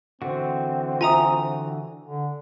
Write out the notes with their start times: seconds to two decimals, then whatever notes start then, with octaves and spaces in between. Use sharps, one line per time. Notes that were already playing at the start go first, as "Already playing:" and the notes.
0.22 D3 E3 C4 F#4
1.01 F4 E5 G#5 A#5 D#6
2.07 D3